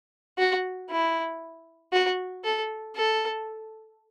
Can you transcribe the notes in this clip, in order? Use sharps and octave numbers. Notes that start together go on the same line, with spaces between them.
F#4
E4
F#4
A4
A4